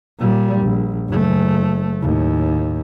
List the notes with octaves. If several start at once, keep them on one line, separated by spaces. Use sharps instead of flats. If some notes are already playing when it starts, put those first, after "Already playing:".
A#2 G3
A#1
F#1 A3
D#2 A2